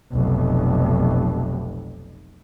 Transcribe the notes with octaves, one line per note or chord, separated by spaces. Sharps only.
F1 B1